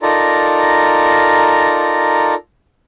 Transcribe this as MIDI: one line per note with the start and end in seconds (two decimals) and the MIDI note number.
0.02 2.35 63
0.02 2.35 65
0.02 2.35 69
0.02 2.35 70
0.02 2.35 74
0.02 2.35 82